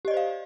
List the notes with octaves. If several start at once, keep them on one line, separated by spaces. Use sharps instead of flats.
G4 C5 D5 D#5 F5